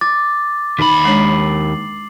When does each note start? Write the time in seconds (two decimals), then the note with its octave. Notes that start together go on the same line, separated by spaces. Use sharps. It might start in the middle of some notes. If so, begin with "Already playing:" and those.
0.01 D6 A6
0.79 D#2 D#4 B5
1.05 G#3 D4 C#5 C7 F#7